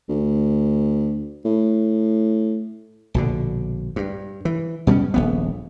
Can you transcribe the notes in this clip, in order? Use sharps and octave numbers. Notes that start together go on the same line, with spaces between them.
D2
A2
A#1 B2 D3
G2
E3
B2 G3 B3 C#4
D#1 A#1 B3